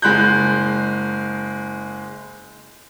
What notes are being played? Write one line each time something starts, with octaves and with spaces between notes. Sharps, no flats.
F#1 G#3 F#6 G6